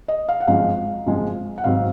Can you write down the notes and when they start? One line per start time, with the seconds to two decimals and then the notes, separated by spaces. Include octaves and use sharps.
0.08 D#5
0.29 F5
0.40 F#5
0.47 G#1 F#2 F3 G#3 F5
1.06 G#1 F#2 F3 G#3
1.58 F#5
1.64 G#1 G#2 F#3 C4 F5